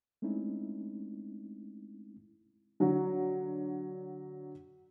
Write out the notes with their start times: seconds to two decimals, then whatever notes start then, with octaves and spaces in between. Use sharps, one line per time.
0.22 G#3 A3 C4 C#4 D#4 E4
2.80 D3 F#3 F#4